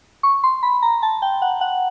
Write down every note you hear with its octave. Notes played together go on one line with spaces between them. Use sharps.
C#6
C6
B5
A#5
A5
G5
F#5
F#5